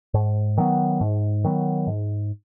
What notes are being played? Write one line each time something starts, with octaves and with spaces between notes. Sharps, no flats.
G#2
D#3 F#3 B3
G#2
D#3 F#3 B3
G#2